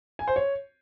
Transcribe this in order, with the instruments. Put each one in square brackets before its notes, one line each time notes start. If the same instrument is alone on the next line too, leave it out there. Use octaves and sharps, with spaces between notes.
[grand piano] G#5
C5
C#5